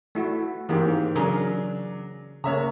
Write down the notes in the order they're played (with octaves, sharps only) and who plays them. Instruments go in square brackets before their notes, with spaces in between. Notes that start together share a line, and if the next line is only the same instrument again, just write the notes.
[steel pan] A3 E4 F#4
[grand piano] G#2 D#3 C4 [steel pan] E3 A#3 G4
[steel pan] C#3 G#4 A#4 [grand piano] F#3 D4
[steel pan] C#3 A#3 [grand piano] C#5 E5 A#5